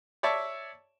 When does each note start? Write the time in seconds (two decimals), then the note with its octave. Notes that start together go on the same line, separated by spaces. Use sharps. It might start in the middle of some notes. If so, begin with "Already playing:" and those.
0.23 C#5 D5 E5 A5 C#6